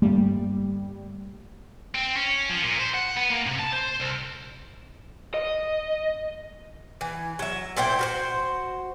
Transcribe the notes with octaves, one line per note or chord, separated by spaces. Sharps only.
G1 G3 A3 A#3
C4
C#4
F3
A#2
C5
F#5
B3
A#3
C3
A5
C5
C2
D#5
E3
F#3 E5
A#2 E4 C5 G5
F#4 A#4 C5